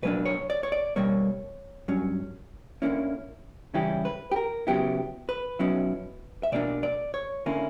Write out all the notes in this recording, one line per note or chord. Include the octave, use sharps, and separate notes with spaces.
B2 F#3 A#3 D4 B4
C#5
D5
C#5
D5
B2 G3 A#3 C#5
G2 F#3 C#4
D2 D3 A#3 C#4 E4
C#3 E3 G3 C#4 E4 G4
B4
G4
A#4
C#3 F#3 B3 E4 G4
B4
B1 B2 F#3 C#4 E4
E5
B2 A#3 D4 D5
D5
C#5
D3 A#3 C#4 E4